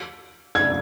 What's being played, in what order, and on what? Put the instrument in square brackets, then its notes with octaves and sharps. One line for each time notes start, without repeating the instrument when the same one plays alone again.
[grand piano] G#6